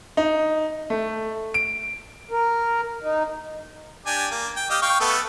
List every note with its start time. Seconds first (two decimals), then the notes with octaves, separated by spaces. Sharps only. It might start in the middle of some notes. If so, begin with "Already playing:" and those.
0.17 D#4
0.90 A3
1.54 D7
2.31 A#4
3.02 D#4
4.06 D4 G4 G#5
4.31 A#3
4.56 G5
4.70 G4 D#5 F5
4.82 F5 G5 C#6
5.00 A3 B3 A4